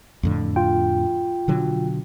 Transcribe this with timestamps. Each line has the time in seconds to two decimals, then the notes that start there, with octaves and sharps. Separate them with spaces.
0.23 F2 A2 D3
0.56 F4 G5
1.48 B2 D3 F#3